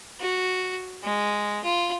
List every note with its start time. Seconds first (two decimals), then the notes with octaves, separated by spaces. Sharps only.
0.21 F#4
1.04 G#3
1.64 F4